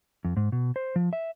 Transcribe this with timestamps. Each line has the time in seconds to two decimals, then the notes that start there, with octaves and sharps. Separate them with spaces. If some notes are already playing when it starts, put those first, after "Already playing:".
0.25 F2
0.37 G#2
0.52 B2
0.76 C5
0.96 F3
1.13 E5